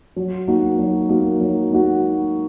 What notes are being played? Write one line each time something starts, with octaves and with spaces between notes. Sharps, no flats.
F#3
A#3 D#4 F#4
F#3
A#3 D#4 F#4
F#3
A#3 D#4 F#4